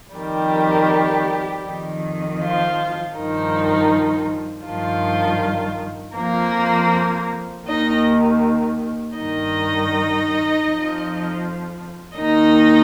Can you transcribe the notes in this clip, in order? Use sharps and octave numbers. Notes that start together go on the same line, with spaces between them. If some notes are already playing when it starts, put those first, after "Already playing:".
F2 D#3 G3 G4
F2 D#3
F3 F4
G2 D#3 F3 D#4
G2 D#3 F3 F4
F2 F3 A#3 A#4
D#2 D#3 D#4 D#5
G2 D#3 D#4 D#5
F2 F3
D#2 D#3 D#4 D#5